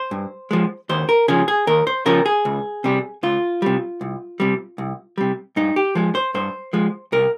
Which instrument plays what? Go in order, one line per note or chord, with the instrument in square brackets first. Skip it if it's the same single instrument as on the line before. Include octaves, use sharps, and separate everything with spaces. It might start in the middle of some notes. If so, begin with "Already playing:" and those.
Already playing: [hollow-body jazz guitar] C5
G2
F3 G#3
D#2 C5
A#4
C#3 F3 G#4
G#4
D#2 A#4
C5
C#3 F3 A#4
G#4
C#2
C3 G3
C#2 F4
C3 G3
C2
C3 G3
C2
C3 G3
G2 D#4
G4
F3 G#3
C5
G2 C5
F3 G#3
C2 A#4